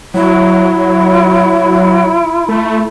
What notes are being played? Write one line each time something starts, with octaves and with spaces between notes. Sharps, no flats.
F#3 E4
A3